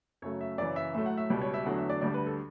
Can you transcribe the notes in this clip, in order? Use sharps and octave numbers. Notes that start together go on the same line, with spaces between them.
F#2 C#3 F#3 A3 C#5
E5
F#2 C#3 E3 D5
E5
A2 F#3 A3 E5
F#5
E5
C#2 B2 G3
C#5
E5
E2 D3 F#3 A3 F#5
E5
D5
D2 D3 G3 D5
B4
A4